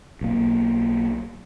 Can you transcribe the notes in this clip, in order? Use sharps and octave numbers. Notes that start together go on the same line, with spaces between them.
B1 A#3